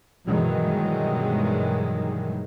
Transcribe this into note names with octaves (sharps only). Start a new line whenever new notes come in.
G2 B2 D#3 E3 F#3 G#3